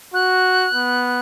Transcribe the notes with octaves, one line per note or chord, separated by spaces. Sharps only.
F#4 F#6
B3